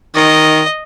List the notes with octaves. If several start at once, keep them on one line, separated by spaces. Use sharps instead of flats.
D#3 D#5